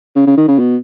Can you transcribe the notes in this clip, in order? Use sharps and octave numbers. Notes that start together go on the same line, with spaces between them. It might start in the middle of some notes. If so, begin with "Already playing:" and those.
C#3
C#3
D#3
C#3
B2